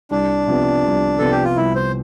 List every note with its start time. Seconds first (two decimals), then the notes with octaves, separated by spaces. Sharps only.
0.11 C2 D4
0.47 C3 F3 B3
0.84 C2
1.19 C3 F3 B3 A4
1.32 G4
1.44 F4
1.57 C2 E4
1.75 C5